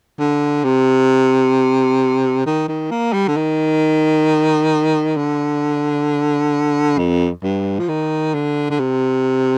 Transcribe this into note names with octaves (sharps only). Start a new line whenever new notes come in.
D3
C3
D#3
D#3
A#3
G3
D3
D#3
D3
F2
G2
F3
D#3
D3
D3
C3